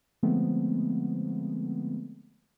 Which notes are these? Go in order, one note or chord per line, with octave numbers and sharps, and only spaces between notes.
D3 F3 G#3 A3 B3 C4